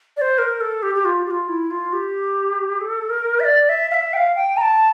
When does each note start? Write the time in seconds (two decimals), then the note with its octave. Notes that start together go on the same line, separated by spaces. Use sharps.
0.17 D5
0.21 C5
0.38 A#4
0.61 A4
0.82 G4
0.94 G4
1.05 F4
1.26 G4
1.30 F4
1.48 E4
1.70 F4
1.93 G4
2.81 A4
3.09 A#4
3.40 E5
3.44 D5
3.69 E5
3.90 F5
3.94 E5
4.13 G5
4.17 F5
4.35 G5
4.57 A#5
4.61 A5